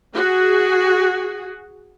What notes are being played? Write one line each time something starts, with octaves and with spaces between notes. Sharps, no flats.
F#4 G#4